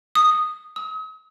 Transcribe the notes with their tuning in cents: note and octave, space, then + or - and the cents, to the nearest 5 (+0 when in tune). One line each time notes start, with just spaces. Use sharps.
D#6 -10
D#6 +45